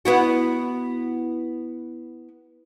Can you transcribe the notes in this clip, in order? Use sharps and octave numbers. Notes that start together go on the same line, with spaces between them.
B3 E4 F#4